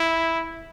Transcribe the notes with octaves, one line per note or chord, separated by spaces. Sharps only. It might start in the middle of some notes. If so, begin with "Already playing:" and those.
Already playing: E4